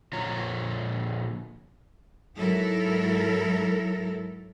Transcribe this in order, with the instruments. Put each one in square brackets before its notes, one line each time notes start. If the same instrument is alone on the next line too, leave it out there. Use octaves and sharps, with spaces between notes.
[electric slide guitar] A#2 D3 F3 F4 C#5 A#5
[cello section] G#2 F#3 E4 A4 A#4